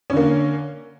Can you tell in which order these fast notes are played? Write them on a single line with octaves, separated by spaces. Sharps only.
C#4 D3 A#3